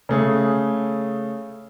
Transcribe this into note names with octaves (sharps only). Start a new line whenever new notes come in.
C#3 A3 G#4